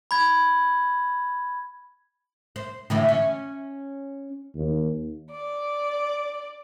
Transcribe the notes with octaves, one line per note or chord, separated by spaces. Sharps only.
B5 G#6
C5
A2 D3 E3
C#4
D#2
D5